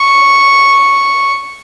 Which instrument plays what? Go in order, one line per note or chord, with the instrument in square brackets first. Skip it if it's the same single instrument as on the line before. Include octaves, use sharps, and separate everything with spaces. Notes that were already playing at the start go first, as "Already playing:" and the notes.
Already playing: [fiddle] C#6